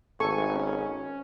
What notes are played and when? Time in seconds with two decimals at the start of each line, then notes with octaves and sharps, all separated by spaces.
0.20 G#1 A4 G#5 C#6
0.55 C#4